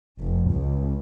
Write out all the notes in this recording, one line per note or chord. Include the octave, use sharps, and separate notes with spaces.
F1
C#2